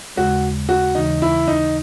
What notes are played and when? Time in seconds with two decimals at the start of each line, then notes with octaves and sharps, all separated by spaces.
0.16 D#2 C#3 G#3 F#4
0.69 F#4
0.95 D#2 C#3 E3 D#4
1.22 E4
1.47 D#4